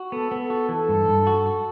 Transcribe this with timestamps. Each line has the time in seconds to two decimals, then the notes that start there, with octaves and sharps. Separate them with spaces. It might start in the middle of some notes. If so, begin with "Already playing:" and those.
Already playing: F#4
0.12 B3 A4
0.31 B3
0.40 A4
0.50 F#4
0.69 E3 A4
0.89 G2
1.08 G2
1.27 F#4
1.46 F#4